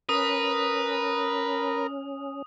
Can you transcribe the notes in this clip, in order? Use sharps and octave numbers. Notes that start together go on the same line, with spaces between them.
C#4 A#4 B4 D#6